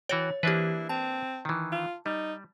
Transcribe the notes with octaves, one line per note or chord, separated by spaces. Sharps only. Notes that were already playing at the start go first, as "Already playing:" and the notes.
E3 F#4 C#5 G5
E3 A#3 D4 E4 G4 B4
C4 A5
D#3 E3
F4
G3 D#4